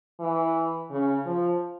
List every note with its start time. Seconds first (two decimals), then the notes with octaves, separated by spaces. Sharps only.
0.20 E3
0.91 C#3
1.26 F3